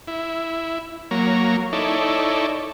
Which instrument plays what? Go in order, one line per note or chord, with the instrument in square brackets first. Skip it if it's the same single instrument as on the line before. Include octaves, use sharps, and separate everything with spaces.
[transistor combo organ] E4
F#3 A#3 C#5 A#5
D#4 E4 A4 C#5 D5